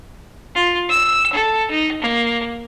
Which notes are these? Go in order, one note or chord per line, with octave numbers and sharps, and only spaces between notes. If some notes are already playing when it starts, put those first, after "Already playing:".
F4
E6
A4
D#4
A#3